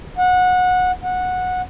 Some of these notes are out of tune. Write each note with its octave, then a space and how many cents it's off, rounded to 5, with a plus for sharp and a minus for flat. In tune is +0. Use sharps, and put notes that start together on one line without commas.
F#5 -20
F#5 -15